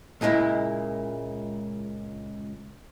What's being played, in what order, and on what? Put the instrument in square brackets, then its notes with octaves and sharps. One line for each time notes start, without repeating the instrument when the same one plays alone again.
[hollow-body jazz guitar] C#2 A#2 G#3 A#3 E4